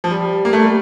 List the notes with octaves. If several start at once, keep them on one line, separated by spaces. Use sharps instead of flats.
F3
G3
A#3
A3
G3